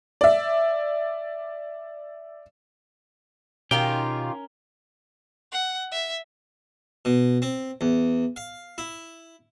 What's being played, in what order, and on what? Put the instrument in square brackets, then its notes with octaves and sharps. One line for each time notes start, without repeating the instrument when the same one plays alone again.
[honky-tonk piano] D5 E5
[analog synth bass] B2 [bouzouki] D#3 F4 G4 [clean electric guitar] C#4 A#4 [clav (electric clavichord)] G5
[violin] F#5
E5
[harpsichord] B2
C4
E2
F5
E4